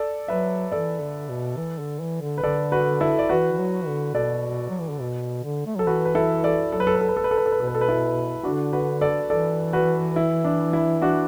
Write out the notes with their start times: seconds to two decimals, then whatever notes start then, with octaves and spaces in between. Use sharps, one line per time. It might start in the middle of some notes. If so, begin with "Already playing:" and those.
Already playing: A4 D5
0.28 F#3 B4 E5
0.72 E3 A4 D5
1.00 D3
1.29 B2
1.57 E3
1.79 D3
2.00 E3
2.21 D3
2.38 B4
2.43 D3 A4 D5
2.72 F#4 B4
3.01 E4 A4
3.19 D5
3.29 E3 F#4 B4
3.52 E3
3.58 F#3
3.87 D3
4.14 B2 A4 D5
4.69 F#3
4.80 E3
4.90 D3
5.01 B2
5.43 D3
5.67 A3
5.76 F#3 A4
5.87 E3 F#4 B4
6.05 B4
6.15 E4 A4
6.44 A4 D5
6.72 F#3 A4
6.80 B4
6.87 A4
6.95 B4
7.01 A4
7.09 B4
7.17 A4
7.24 B4
7.31 A4
7.37 B4
7.46 A4
7.52 B4
7.58 B2 A4
7.67 B4
7.75 A4
7.81 B4
7.89 E4 A4
8.44 D3 D4 F#4
8.73 F#4 B4
9.01 A4 D5
9.29 E3 A4 D5
9.73 F#4 B4
10.16 E4
10.44 D4
10.73 E4
11.02 D4 F#4